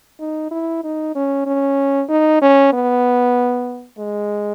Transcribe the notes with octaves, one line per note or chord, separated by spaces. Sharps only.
D#4
E4
D#4
C#4
C#4
D#4
C#4
B3
G#3